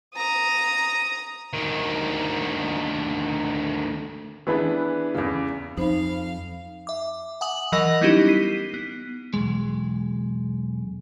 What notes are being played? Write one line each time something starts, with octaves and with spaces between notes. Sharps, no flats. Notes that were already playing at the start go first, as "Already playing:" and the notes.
A#5 D#6
D2 D#3
E3 B3 D4 G#4 B4
E2 C#3
F2 D#4 C5 F5 B5
E5 D6
F#5 G#5 D#6 F#7
E3 F#3 A#4 D#5 F#5 A#6
G3 B3 C#4 D#4 E4 G4
B6 C7 D#7
B3
B1 E2 G#3